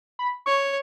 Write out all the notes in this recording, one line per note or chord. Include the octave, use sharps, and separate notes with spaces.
B5
C#5 C#6